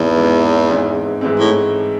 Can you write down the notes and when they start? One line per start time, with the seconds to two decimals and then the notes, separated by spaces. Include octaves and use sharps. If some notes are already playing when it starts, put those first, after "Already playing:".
Already playing: E2 G#2 E3 G#3 C4
0.17 G#2 E3 G#3 C4
0.70 G#2 E3 G#3 C4
1.21 G#2 E3 G#3 C4
1.39 A2